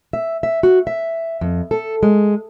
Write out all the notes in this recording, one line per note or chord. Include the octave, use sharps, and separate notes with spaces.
E5
E5
F#4
E5
F2
A4
G#3